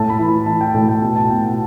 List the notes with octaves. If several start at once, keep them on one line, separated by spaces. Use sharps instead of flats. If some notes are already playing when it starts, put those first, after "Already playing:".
Already playing: A2 A5
B5
E3
B5
E3 A5
G5
A2 A5
G5
B2 A5
A5
B2 G5
F#5